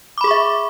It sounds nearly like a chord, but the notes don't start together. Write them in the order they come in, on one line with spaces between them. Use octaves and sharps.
D6 B5 G#4 C#6 E5